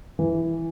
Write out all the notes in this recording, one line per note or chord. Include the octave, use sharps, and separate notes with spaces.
E3